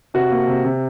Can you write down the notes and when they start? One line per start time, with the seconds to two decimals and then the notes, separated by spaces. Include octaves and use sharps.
0.14 C3 F#4
0.31 A#3
0.48 C3
0.65 C3